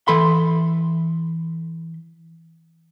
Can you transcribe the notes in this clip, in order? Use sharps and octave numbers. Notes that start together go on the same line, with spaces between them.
E3 A4 B5 C6